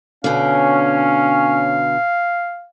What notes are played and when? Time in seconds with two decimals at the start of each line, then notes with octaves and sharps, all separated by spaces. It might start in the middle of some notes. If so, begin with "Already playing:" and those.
0.24 B2 D3 C#4 F5